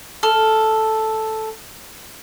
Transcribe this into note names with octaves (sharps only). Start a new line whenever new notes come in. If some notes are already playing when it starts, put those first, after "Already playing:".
A4 F6